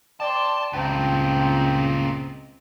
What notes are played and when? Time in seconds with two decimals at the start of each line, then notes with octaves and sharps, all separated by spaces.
0.20 D5 G5 A5 C6
0.73 C#2 G2 A#2 C4 D#5 G5